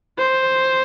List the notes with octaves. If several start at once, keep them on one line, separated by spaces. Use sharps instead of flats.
C5